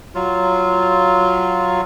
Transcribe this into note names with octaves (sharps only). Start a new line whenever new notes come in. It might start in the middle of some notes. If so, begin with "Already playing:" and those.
F#3 F4